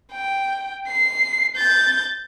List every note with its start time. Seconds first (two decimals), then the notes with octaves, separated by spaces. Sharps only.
0.12 G5
0.88 C7
1.56 G6 A6